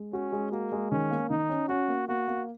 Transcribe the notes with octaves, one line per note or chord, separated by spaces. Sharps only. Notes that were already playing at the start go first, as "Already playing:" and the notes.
Already playing: G#3
C#4 F#4
G#3
A#3 F#4
G#3
D#3 C#4
A#3
D#3 D#4
C#4
C#4 F#4
A#3
A#3 F#4
A#3